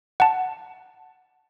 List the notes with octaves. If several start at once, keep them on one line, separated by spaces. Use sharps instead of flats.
F#5 A5